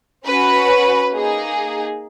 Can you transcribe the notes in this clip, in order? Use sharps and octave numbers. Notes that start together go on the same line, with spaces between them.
C#4 F#4 B4
A#3 D#4 G#4